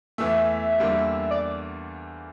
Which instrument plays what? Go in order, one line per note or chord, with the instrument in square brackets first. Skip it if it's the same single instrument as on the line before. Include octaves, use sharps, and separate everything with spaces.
[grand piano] E2 E3 A3 [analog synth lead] E5
[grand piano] E2 D3 G3 A#3
[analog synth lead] D5